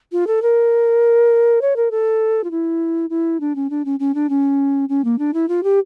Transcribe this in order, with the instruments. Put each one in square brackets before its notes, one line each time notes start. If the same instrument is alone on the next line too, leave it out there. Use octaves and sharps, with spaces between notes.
[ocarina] F4
A4
A#4
C#5
A#4
A4
F4
E4
E4
D4
C#4
D4
C#4
C#4
D4
C#4
C#4
A#3
D4
E4
F4
G4